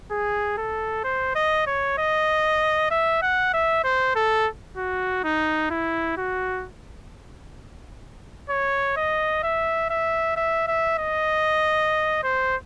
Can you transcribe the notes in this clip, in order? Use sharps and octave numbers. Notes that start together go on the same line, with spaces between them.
G#4
A4
C5
D#5
C#5
D#5
E5
F#5
E5
C5
A4
F#4
D#4
E4
F#4
C#5
D#5
E5
E5
E5
E5
D#5
C5